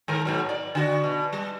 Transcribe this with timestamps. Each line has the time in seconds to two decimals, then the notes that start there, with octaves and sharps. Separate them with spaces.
0.08 G#2 D#3 A#4
0.25 G#2 B2 F#3
0.49 D5
0.75 D3 F#4
1.04 B2
1.32 G3